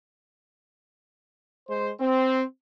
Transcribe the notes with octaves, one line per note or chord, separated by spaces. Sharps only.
G#3 C5
C4